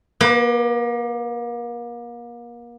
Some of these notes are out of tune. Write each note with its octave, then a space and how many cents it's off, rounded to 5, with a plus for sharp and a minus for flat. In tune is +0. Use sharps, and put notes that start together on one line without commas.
A#3 +35 B4 +0